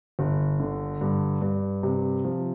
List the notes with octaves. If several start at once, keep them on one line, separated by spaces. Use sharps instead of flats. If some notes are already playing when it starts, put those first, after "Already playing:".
G1
D3
G2
G2
C3
F3